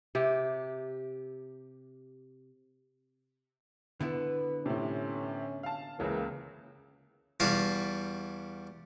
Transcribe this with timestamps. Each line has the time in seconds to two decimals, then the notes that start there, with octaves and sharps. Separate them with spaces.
0.15 C3 G4
4.00 D3 B3 E4 B4
4.66 A2 C3 C#4
5.63 F5 A5
5.99 C#2 C#3 E3 A#3
7.40 E2 G3 F#4 F5 A5